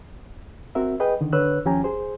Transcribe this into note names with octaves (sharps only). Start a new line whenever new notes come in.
C4 F#4 A#4 E5
G#4 B4 D#5 G5
D3 D#3
D3 B4 C#5 E6 F#6
D#2 F3 C#4 G4 G#5 A#5
G#4 C5